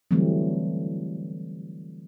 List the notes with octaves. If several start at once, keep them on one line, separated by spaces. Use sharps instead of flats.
D3 E3 F#3 G3 A3 C4